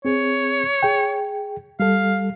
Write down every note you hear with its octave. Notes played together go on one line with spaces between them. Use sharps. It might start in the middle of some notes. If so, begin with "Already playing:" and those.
C4 G#4 C#5
G#4 G5
G3 A4 F5